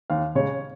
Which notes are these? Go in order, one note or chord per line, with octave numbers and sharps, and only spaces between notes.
D#2 F5
C#3 G#3 C#5